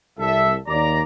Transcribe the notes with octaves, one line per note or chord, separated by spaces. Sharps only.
C2 A4 E5
D#2 D5 A#5